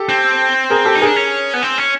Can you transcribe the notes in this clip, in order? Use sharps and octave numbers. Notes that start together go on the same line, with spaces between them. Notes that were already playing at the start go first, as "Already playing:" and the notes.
Already playing: G4 A4
C4
G#4 A#4
G4 A4
D#4
D4 G#4 A#4
C#4
B3
C4
C#4